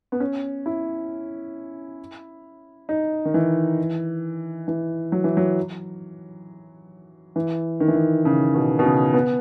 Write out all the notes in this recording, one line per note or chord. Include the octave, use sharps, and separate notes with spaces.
B3
C#4
E4
D#4
D#3
E3
E3
F#3
E3
F#3
E3
D#3
E3
D#3
C#3
B2
B2
C#3
B3